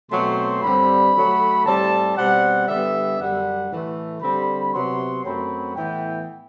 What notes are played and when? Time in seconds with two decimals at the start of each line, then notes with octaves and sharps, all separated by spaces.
0.12 B2 F#3 A3 C4 C6
0.63 G2 D3 G3 C4 B5
1.15 D3 F#3 A3
1.66 A2 G3 C4 A5
2.17 B2 G3 C4 F#5
2.68 D3 G3 B3 E5
3.20 F#2 D3 G3 F#5
3.71 A2 E3 A3
4.22 D3 G3 C4 B5
4.74 C3 F#3 B3 C6
5.25 F#2 F#3 A3 C4 B5
5.76 A2 E3 B3 G5